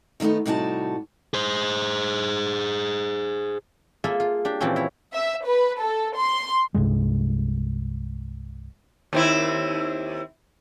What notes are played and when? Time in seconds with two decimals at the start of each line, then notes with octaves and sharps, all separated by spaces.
0.20 D#3 G3 A3 B3 D#4
0.46 A2 C3 G3 D#4 F#4 A5
1.34 G#4 C5
4.04 A#3 F4 G#4 A4 E5
4.20 F4
4.45 D4 G4
4.60 A#2 E3 F3 C4 C#4
4.76 E4 C#5
5.14 E5
5.46 B4
5.80 A4
6.17 C6
6.74 C2 G2 C3 G#3
9.13 D#2 C4 E4